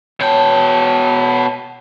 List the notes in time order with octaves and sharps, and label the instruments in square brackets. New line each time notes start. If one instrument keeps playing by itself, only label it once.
[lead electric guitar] B2 G5 [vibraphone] C#5 A5